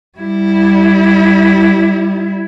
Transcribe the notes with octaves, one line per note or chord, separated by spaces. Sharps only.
G3 E4